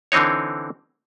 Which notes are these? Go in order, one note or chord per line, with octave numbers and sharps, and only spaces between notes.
D3 E3 C4 D#4 C#5